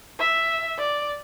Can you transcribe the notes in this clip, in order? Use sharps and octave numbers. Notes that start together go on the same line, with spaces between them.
E5
D5